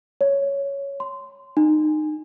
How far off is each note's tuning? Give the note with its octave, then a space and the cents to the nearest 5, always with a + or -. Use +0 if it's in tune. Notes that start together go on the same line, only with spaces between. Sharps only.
C#5 +5
C6 -15
D#4 -25